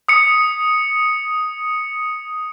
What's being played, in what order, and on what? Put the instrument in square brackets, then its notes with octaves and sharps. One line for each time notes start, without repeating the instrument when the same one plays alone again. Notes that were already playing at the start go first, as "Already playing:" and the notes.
[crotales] D#6 C#7